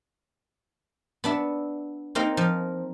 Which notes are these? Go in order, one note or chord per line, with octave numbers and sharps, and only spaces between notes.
B3 D4 E5
A#3 C4 D#4 F5
F3